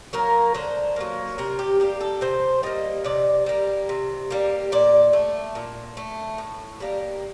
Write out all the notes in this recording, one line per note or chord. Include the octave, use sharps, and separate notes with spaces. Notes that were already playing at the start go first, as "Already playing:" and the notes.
F#3 A#3 A#4
D3 C5
F#3 A#3
C3 A#4
G4
G3 A#3 G4
A4
C3 C5
G3 A#3 D#5
C3 D5
G3 A#3
C3
G3 A#3
A#2 D5
A3
A#2
A3
A2
G3 A#3